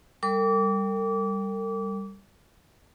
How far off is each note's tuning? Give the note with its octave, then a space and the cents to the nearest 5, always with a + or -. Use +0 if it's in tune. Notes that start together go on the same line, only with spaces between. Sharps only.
G3 +0 A#4 -45 D6 -30